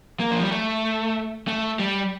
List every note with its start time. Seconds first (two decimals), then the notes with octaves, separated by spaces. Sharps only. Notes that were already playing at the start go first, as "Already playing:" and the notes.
0.20 A#3
0.31 F3
0.41 G3
0.52 A3
1.48 A3
1.79 G3